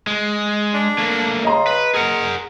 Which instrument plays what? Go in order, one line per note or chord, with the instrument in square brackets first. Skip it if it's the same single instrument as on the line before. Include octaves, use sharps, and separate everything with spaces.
[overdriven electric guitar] G#3
[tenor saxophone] D4
[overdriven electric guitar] A3 A#3
[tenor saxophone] C#3 [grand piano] D#5 A#5 C6
[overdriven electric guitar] B4
[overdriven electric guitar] G#4 F#5 [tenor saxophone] A#4